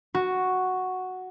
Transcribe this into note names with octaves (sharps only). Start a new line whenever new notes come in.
F#4